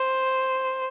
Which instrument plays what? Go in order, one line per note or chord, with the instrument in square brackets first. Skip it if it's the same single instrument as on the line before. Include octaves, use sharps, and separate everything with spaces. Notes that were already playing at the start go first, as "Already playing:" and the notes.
Already playing: [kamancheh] C5